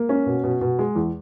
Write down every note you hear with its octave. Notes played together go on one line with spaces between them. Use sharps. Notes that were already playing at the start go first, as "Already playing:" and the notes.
Already playing: A#3
C#4
B2
B2
B2
G#3
E2